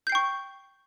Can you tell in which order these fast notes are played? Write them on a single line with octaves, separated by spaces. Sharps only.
G6 C7 G5 C#6